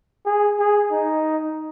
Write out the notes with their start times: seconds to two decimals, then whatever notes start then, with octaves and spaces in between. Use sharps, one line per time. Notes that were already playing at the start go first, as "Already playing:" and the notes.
0.26 G#4
0.59 G#4
0.91 D#4